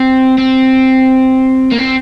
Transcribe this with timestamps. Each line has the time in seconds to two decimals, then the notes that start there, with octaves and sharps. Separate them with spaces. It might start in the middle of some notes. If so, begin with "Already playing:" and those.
Already playing: C4
0.38 C4
1.71 A#3
1.78 C4